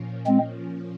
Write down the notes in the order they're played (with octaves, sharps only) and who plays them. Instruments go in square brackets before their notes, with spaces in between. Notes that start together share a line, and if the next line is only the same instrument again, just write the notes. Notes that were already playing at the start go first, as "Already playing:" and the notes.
Already playing: [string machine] A#2 F3 A#3 C#4
[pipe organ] G#3 C4